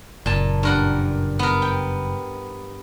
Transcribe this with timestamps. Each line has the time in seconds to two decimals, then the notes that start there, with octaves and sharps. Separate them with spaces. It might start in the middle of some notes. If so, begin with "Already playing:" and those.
0.26 F#1 A#2 A5
0.63 G2 A#4 F#5
1.39 B3 A#4
1.62 G5